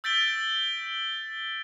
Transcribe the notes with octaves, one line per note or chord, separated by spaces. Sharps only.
E6 G6 A6 B6 D7 G7